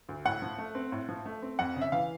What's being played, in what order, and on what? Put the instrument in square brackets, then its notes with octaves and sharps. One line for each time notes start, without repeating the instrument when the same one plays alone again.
[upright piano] D2
A2 F#5
F3
A3
C4
A2
F3
A3
C4
F2 F#5
C#3
E5
E3 F5